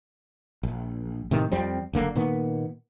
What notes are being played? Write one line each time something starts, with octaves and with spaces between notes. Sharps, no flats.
A#1
A2 C3 D#3
F2 F3 G3 C4
F#1 D3 A#3
A#2 D#3 A#3 B3